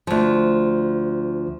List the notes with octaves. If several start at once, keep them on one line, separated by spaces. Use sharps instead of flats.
D2 F3